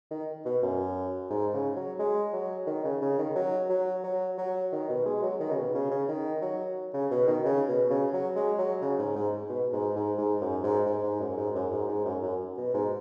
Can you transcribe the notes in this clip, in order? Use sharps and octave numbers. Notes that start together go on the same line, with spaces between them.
D#3
B2
F#2
G#2
C#3
F#3
G#3
F#3
D#3
C#3
C#3
D#3
F#3
F#3
F#3
F#3
D#3
B2
G#3
F#3
D#3
C#3
B2
C#3
C#3
D#3
F#3
C#3
B2
D#3
C#3
B2
C#3
F#3
G#3
F#3
C#3
G#2
G#2
B2
G#2
G#2
G#2
F#2
G#2
G#2
G#2
F#2
G#2
F#2
G#2
G#2
F#2
F#2
B2
G#2